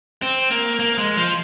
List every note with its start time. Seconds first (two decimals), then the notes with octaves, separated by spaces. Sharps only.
0.22 C4
0.51 A#3
0.79 A#3
0.98 G#3
1.17 F3